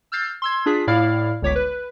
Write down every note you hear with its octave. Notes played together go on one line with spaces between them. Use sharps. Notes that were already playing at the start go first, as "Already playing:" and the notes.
E6 F6 G6 A6 C7
C6 E6 G#6
D4 F4 G#4 B6
A2 E4 D5 F5 F6
G1 C#2 C#5 D6 B6
B4